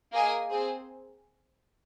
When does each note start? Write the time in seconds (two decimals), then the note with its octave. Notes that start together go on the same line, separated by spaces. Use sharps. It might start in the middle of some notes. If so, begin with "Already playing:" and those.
0.13 A#3 G#4 D#5 G#5
0.50 C4 G#4 C5